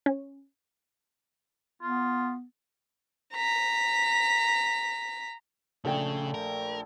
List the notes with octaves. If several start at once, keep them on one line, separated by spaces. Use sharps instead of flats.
C#4
B3 F4
A#5 B6
A#1 C#3 A3 G5
A#4